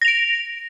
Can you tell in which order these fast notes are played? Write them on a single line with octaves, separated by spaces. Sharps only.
A#6 F7 D7